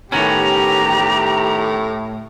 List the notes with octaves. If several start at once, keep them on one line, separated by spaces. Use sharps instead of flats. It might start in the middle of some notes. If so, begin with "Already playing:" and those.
A2 D#3 B3 C#4 G4 A#5